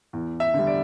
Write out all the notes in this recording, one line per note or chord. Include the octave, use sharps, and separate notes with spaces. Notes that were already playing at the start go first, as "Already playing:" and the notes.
E2
E5
D3 G3
D5